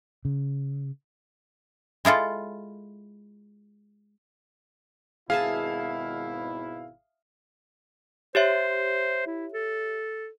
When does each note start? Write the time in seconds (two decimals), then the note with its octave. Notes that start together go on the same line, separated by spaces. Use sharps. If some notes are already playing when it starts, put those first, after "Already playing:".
0.25 C#3
2.05 G#3 E4 F4 A4
5.30 G#1 B2 E4 G#4 E5 F5 A5
8.35 G4 C5 C#5 E5
9.26 E4
9.53 A4